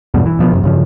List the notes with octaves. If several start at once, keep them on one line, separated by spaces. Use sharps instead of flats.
E2 G2 B2
E3
B2 F3 G3 B3
F#2 A2 C3
G2 C#3 F3